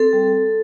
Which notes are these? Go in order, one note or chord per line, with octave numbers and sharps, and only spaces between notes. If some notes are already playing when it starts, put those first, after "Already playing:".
Already playing: C4 A4
G3